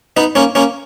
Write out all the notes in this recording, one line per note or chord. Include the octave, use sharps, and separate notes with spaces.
B3 D#4
A#3 C#4
A#3 C#4